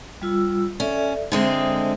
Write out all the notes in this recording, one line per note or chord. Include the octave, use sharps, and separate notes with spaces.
G3 F4 E6
C#4 A4 D5 E5
D3 G#3 C4 C5 E5